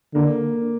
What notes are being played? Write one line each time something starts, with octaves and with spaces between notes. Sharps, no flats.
D3 A#3